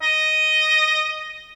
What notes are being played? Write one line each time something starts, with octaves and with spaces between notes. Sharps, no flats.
D#5